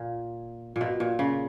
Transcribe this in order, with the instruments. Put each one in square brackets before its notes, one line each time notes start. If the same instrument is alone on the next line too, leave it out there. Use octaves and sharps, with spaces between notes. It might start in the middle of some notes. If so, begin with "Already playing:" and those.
Already playing: [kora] A#2
A#2
B2
A#2
C#3